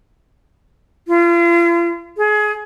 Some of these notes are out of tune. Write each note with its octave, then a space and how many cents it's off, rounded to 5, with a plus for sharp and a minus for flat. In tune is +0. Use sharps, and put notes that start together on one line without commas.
F4 -40
G#4 +25